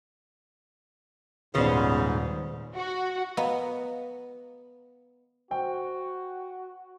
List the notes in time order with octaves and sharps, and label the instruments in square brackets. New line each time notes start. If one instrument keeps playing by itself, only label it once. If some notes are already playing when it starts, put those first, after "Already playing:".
[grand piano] D#1 D5 [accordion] G#2 [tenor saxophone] C#3 [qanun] B3 C5 F#5
[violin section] F#4
[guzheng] B3 [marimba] D#5 F5 A#5
[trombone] F#4 [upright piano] C5 G5